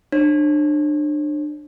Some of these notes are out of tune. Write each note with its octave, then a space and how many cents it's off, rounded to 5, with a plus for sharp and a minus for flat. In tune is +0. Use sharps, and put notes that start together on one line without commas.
D4 +25 C#5 -45